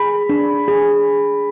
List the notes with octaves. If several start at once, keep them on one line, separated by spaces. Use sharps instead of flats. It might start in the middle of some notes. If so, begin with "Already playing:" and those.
Already playing: G#4 B5
D4
G#4